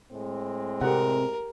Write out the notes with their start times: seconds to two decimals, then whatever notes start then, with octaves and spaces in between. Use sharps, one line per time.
0.12 A2 G#3 C4
0.81 C3 G4 A4 A#4 F#5